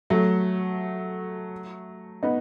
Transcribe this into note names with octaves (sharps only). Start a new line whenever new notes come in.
F#3 A3
B3 D#4